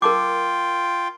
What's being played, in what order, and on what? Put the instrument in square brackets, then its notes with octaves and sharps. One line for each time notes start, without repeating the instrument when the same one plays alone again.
[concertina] F4 G5 [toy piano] A#4 A5 D6